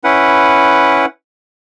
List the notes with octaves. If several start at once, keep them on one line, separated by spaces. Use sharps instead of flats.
C#4 E4 B4 F#5